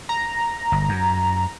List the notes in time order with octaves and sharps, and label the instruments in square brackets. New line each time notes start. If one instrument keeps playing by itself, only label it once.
[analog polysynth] A#5
[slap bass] G1
F#2